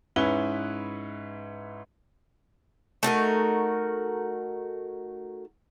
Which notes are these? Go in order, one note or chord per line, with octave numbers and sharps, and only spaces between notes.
G#2 C#4 E4 B4 G7
A3 D#4 F#4 A#4